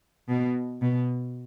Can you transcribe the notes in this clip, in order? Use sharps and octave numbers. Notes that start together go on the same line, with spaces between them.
B2
B2